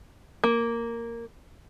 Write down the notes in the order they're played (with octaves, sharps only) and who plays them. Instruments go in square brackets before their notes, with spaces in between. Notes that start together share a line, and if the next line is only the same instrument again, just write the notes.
[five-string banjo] A#3